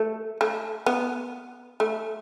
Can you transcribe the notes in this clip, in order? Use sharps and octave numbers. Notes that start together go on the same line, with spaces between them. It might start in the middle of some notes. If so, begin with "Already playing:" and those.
Already playing: A3
A3
B3
A3